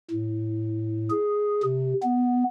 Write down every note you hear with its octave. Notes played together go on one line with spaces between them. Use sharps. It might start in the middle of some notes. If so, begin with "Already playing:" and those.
A2
G#4
C3
B3